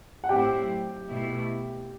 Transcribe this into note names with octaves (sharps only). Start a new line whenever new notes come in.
F#5
A2 F#3 C4 E4 G4 G5
B2 A3 E4